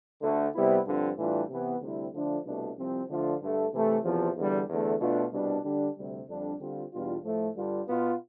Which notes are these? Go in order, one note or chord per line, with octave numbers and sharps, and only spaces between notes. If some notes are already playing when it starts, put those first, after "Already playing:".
D2 D3 A3
C3 G3 B3 E4
G2 D3 F3 C4 F4
A2 E3 G3 D4 F4
C3 E3 B3 E4
D2 C3 G3 C4 E4
D3 F3 A3 D4 F4
C2 B2 A3 D4
C2 C3 F3 C4
D3 F3 A3 D4 F4
G2 D3 A3
C3 E3 A3
E2 C3 F3
E2 D3 G3
E2 D3 A3
B2 A3 D4 F4
C2 B2 G3 D4
D3 G3 D4
D2 C3 G3
F2 D3 G3 D4
D3 G3 C4 F4
E2 B2 G3 D4 F4
A2 F3 A3
G2 D3 G3 D4 F4
B2 B3 F4